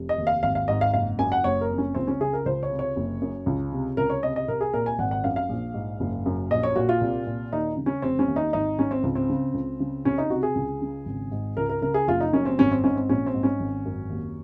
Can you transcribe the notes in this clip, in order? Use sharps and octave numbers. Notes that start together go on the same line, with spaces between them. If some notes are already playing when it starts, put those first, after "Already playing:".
Already playing: F1
D#5
D#2
F5
G#1 F5
F5
G#2 D#5
F5
F#1 F5
F#2 G#5
F#5
F#1 C#5
A#4
F2
C#4
C#2 C4
C#4
C#3 G#4
A#4
C#2 C5
C#5
C3
C#5
F#1
F#2
C#2
C3
C#2 A#4
C#5
C3 D#5
D#5
C2 A#4
G#4
A#2 A#4
G#5
G#1 F#5
F#5
F#2 F5
F5
A#1
G#2
F#1
F#2
A#1 D#5
C#5
A#2 F#4
F4
C2
A#2
D#2 D#4
C#3
C#4
F1 C4
C#4
D#2
D#4
G#1 D#4
G#2 C#4
C4
C#2
C4
C#3
C#2
C#3
C2 C#4
D#4
C3 F#4
G#4
C#2
C#3
G#1
G#2
C#2 A#4
A#4
C#3 A#4
G#4
F#1 F4
D#4
F#2 C#4
C4
G#1 C#4
C4
G#2 C#4
C4
A#1 C#4
C4
G#2
C#4
G#1
F#2
D#2